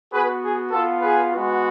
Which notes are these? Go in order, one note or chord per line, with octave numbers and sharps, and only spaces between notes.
B3 F#4 G#4 B4
G#4
B3 F4 A4
G#4 B4
G#3 B3 F#4